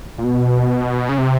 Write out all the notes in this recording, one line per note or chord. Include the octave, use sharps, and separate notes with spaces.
A#2
B2
C#3
C3